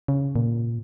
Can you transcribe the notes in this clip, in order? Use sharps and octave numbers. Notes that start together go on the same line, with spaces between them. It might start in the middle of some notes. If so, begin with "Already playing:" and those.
C#3
A#2